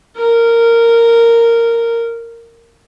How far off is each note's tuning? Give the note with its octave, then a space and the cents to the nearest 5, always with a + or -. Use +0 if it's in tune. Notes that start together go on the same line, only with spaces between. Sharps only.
A#4 -10